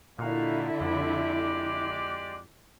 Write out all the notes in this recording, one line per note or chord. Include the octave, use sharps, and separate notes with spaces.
A#2 D3 D#4 E4 F#4 F5
F2 G#3 G4 D5